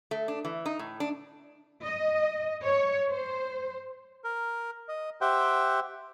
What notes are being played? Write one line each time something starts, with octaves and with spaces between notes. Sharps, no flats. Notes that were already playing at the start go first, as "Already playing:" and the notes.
A3
D4
E3
D#4
A2
D4
D#5
C#5
C5
A#4
D#5
G4 C5 E5 F#5 G5